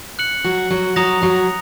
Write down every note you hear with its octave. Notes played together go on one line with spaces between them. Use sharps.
F#6 C#7 F#7
F#3 F#4
F#3 F#4
F#3 F#4 A#5 D#6 A#6 F7
F#3 F#4